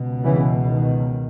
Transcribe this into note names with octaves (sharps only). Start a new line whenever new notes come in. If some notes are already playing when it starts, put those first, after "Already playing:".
Already playing: C#2 B2
C#3 E3
D#3